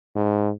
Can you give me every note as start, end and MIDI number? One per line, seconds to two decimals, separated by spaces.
0.15 0.51 44